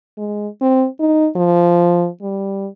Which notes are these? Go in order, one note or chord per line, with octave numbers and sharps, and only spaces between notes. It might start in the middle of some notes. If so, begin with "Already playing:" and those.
G#3
C4
D#4
F3
G3